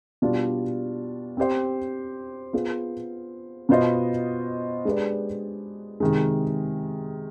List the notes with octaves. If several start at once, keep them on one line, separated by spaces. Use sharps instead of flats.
B2 G3 D4 F4
C4 G4 C5
B3 F4 G#4 C5
B2 B3 F4 C5 D#5
G#3 D4 G4 B4 D5
C3 D#3 G#3